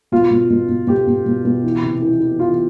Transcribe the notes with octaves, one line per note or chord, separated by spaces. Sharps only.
B2 F4
B2
B2
B2
B2 G4
B2
B2
B2
E3
C3
E3
E3
E3 F4